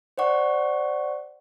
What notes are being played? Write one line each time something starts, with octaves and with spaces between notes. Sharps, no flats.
C5 D5 F#5 C#6